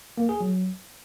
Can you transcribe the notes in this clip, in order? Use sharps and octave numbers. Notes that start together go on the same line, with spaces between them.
A#3
G#4
F#3